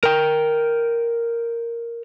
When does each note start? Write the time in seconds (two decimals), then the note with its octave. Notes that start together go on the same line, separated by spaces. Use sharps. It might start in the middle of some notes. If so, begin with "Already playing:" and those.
0.03 A#4 G5